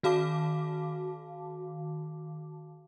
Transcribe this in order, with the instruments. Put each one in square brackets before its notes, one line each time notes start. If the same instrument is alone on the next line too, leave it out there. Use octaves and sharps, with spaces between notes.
[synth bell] D#3 F#4 F5 A5 D6